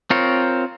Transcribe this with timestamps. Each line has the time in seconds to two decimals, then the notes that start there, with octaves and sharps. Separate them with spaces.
0.10 C4 F4 A#4 C#5